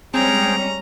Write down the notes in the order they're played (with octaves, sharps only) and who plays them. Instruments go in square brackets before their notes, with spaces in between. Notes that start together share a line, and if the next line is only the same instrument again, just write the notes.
[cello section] G3 G#3 C#4 [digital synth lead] C4 [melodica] G#4 G5 [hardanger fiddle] A#5